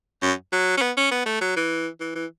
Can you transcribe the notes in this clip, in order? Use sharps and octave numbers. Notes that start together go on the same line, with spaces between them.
F#2
F#3
C#4
B3
C#4
B3
A3
F#3
E3
E3
E3